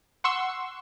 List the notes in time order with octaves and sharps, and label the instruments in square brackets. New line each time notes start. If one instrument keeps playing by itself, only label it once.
[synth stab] F#5 C6 C#6 E6